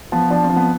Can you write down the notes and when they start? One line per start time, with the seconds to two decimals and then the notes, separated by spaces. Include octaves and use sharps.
0.12 F3 B3
0.30 F3 D4
0.44 C4
0.50 F3
0.56 B3